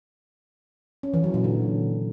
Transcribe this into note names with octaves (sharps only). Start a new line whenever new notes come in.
C#4
E3
F#3
A#2
D3